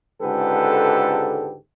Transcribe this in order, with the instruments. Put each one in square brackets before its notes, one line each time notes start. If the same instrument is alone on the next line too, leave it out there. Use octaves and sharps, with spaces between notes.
[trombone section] C#2 G#2 D3 G4 A4 B4